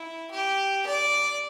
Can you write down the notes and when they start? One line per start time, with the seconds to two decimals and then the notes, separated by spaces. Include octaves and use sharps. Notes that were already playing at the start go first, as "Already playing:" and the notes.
Already playing: E4
0.31 G4
0.86 D5